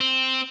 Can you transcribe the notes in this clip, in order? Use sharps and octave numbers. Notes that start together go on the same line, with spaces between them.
C4